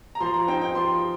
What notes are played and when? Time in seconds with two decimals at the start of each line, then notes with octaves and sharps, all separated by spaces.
0.15 A#5
0.21 F3 C6
0.34 A#5
0.47 C4 D#4 G5
0.62 G5
0.75 F3 C6